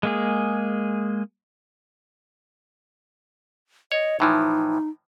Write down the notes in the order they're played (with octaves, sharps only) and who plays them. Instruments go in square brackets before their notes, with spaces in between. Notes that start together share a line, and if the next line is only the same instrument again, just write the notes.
[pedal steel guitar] G#3 A#3 G#4
[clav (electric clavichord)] C#5 [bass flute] D#5
[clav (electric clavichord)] A2 E3 F3 [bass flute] D#4